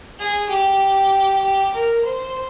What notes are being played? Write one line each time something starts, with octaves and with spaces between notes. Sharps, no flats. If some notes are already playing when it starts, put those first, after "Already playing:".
G#4
G4
G4
A#4
C5